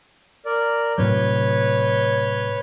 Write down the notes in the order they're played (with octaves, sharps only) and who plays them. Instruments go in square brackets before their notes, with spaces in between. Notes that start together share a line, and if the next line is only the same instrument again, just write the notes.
[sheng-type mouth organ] A#4 D5
[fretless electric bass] A2 C3 F#3 [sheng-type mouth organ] B4 C#5 G6